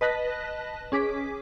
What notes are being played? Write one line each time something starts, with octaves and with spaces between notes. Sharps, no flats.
B4 D#5 A5 F#6 A#6 B6
C#4 G#4 D6 B6